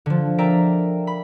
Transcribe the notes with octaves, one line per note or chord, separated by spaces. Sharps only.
D3 F3
A#4 D5 E5 G5 A#5
B5